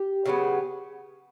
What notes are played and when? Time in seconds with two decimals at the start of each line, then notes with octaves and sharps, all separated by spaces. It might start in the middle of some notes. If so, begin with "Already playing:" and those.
Already playing: G4
0.25 C#3 F#3 B3